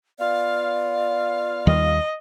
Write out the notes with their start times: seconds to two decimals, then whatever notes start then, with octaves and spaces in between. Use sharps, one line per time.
0.19 B3 F4 D5 F5
1.67 D#2 D#3 G3 D#5